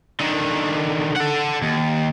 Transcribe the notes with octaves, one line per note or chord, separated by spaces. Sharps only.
D3 D#3
A4 F#5
D#2